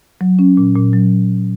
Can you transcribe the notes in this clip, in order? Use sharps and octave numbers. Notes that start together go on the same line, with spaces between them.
F#3
C#4
A#2
A#2
F#3